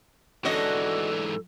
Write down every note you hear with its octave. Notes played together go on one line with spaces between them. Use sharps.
G#2 E3 C#4 D4 F#4 A4 D#5